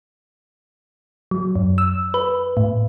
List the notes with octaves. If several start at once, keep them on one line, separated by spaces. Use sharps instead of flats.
F#3
F#2
E6
B4
A2